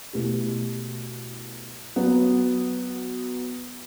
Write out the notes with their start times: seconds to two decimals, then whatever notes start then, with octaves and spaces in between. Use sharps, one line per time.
0.13 B2 A3 E4 G4
1.96 F#3 B3 F#4